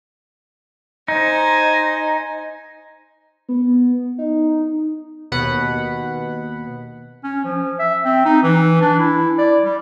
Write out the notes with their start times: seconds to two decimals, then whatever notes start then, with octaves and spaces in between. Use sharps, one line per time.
1.08 D#4 C5 G#5
3.49 B3
4.18 D#4
5.32 D#2 B2 B3 F#5 B5
7.24 C#4
7.44 F3
7.79 E5
8.05 C4
8.26 D#4
8.43 E3
8.81 D4
8.99 E4
9.38 D5
9.64 G3